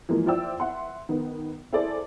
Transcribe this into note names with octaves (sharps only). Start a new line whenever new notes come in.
E3 F3 G#3 A#3
F4 C5 D5 E5 G5 E6
E5 F#5 C6
D#3 B3
E4 G#4 A4 C5 D5